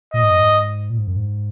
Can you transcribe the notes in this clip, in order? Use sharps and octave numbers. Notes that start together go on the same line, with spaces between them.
A#2 D#5
G#2
F#2
G#2
A#2
G#2
F#2
G#2